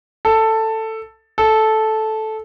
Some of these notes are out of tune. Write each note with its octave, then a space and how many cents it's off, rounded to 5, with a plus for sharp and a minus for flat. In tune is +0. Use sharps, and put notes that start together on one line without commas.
A4 +10
A4 -10